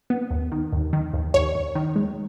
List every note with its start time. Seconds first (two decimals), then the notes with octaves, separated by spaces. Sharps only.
0.10 B3
0.30 D#2
0.52 D#3
0.73 D#2
0.93 D#3
1.13 D#2
1.34 D#2 C#5
1.55 D#2
1.75 D#3
1.96 G#3